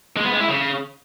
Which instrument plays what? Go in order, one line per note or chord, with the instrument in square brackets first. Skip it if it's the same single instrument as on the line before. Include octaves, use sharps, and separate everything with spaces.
[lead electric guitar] G#3
B3
G#3
E4
C#3